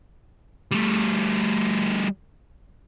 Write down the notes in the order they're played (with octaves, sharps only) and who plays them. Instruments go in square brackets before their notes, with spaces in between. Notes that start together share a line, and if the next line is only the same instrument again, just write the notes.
[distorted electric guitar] G3 A3